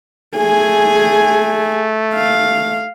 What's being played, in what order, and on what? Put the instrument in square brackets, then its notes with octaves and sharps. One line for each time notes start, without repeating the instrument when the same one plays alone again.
[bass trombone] A3 [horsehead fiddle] G#4 G#5
[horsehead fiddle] F5